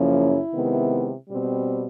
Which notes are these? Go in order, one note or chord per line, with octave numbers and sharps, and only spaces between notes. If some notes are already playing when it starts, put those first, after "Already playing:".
Already playing: F#2 C#3 F3 A#3 C#4 E4
C3 D#3 G#3 B3
B2 G3 C4